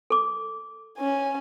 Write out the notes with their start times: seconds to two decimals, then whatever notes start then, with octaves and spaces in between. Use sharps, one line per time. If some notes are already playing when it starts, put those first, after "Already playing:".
0.10 A4 D6
0.98 C#4 G#5